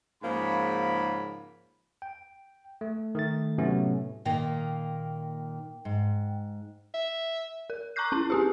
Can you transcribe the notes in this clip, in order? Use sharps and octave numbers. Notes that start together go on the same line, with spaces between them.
G#2 C#3 F3 A#3 C#4 B5
G5
A3
D#3 A3 A6
A2 C3 F#3 A3 B3 C#4
A#2 D#3 A#3 G5
G#2
E5
A#4
A#5 C#6 D6 F#6 G6 C7
C#4 E4
C4 G4 G#4